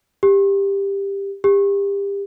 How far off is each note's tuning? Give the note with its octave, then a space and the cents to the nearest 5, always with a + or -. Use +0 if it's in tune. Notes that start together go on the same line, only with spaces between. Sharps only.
G4 +15
G4 +30